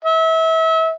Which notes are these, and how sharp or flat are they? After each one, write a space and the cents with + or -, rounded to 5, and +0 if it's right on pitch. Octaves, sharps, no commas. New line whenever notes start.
E5 -30